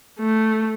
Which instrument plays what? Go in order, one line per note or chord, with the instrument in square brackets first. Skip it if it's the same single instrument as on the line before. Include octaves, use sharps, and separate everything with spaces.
[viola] A3